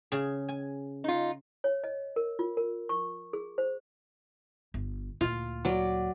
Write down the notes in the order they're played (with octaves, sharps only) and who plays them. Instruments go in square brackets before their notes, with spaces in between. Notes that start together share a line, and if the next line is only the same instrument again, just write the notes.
[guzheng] C#3 G#4
G#5
[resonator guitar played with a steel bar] D#4 F4
[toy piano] C#5
D#5
A#4
F4
A#4
C#6
G#4
C5
[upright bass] G1
[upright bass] D2 A#2 [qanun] F4
[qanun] F#3 D5